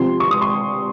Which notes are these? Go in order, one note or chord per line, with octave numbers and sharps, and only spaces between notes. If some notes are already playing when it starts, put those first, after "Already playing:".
Already playing: C3 F3 C6
C#6
D#6
C6